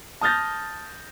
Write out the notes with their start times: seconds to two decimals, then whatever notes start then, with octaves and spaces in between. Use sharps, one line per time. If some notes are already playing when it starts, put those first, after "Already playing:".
0.21 A5 D#6 F6 G6 A6 A#6